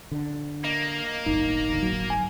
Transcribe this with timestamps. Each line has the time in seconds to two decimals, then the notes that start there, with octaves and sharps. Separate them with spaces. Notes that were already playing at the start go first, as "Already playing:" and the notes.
0.12 D3
0.64 A#3 D#5
1.26 D1 G1 D#4
1.70 D#2 D3
1.82 F#3
2.10 G#5